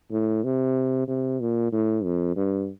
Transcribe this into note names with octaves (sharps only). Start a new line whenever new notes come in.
A2
C3
C3
A#2
A2
F2
G2